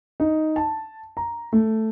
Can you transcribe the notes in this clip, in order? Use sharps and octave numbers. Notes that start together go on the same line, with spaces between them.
D#4
A5
A#5
A3